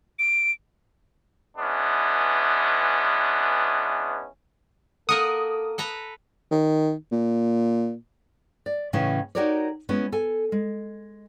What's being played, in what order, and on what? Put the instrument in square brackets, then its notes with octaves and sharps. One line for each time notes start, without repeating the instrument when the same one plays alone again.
[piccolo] D7
[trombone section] E3 G#3 B3 C#4 D4
[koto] A#3 A#4 F#5 [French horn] A4 [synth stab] D#6
[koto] A4 B4 A#5
[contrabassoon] D#3
A#2
[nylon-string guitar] D5
A2 C#3 E3 C#4 D#5
D#4 F#4 G4 A#4 C#5 D5
G#3 B3 C#4 E4
A4 G#5
G#3